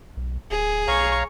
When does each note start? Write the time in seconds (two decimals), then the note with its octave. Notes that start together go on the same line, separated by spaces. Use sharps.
0.17 B1
0.51 D1 G#4
0.88 B1 C#5 F5 A#5 C#6